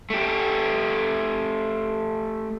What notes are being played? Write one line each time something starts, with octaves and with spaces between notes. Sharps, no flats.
A3 G4